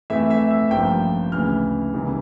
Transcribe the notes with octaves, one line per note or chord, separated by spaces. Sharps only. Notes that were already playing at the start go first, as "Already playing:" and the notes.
F2 E3 A3 E5
E5
E5
A1 G2 F3 A#3 G5
D2 C#3 E3 F6
C#2 C#3 E3 G3 A#3